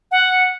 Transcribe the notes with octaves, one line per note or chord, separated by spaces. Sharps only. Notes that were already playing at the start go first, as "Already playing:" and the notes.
F#5